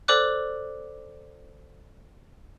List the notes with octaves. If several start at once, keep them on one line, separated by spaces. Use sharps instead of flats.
A4 C5 D5 D6 F#6